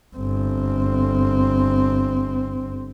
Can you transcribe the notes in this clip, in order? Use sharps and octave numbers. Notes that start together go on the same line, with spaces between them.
G1 C4